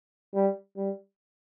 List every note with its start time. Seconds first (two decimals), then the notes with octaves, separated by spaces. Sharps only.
0.34 G3
0.76 G3